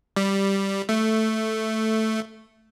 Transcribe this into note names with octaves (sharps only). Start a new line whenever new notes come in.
G3
A3